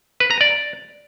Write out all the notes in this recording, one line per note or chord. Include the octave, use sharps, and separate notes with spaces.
B4
A#5
D5